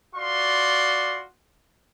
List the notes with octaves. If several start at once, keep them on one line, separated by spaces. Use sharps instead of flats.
F4 F#4 D5 C6